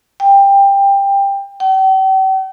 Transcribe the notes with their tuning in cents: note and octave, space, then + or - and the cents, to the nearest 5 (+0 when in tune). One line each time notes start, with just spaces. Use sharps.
G5 +15
G5 -45